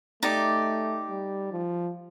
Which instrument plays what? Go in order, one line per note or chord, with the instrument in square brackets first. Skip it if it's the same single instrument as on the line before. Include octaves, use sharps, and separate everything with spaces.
[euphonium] A3 [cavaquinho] D#4 G4 D5
[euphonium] G3
F3